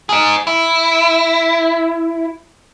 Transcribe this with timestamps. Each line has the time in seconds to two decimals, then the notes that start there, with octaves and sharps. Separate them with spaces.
0.09 D#4 G#4
0.47 E4